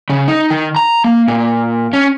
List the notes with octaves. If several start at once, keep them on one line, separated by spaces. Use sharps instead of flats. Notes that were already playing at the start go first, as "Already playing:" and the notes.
C#3
D#4
D#3
A#5
A#3
A#2
C#4